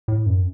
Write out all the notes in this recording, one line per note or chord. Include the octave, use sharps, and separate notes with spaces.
A2
F#2